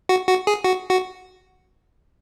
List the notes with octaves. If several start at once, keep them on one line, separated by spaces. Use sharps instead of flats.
F#4
F#4
G#4
F#4
F#4